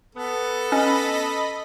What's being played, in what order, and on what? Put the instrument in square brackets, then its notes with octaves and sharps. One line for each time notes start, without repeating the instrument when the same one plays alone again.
[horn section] B3 [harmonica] A4
[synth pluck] C#4 [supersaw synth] D#5 B5